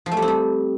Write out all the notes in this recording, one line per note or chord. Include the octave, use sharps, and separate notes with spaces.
F3
A3
G3
C4
G3